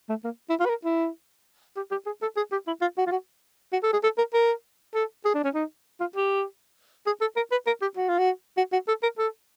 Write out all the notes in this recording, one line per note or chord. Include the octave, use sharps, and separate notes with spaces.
A3
A#3
E4
F4
B4
A#4
E4
G4
G4
G#4
A4
G#4
G4
E4
F4
F#4
F4
F#4
F#4
A4
G#4
A4
A#4
A#4
A4
G#4
D4
C#4
D#4
F4
G4
G#4
A4
A#4
B4
A#4
G4
F#4
F4
F#4
F#4
F#4
A4
A#4
A4